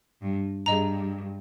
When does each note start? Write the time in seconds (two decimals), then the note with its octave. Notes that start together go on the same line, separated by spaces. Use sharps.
0.21 G2
0.66 G2 G#4 D#5 A#5